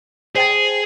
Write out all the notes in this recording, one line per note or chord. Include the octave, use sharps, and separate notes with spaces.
G#4 C5 G5 A5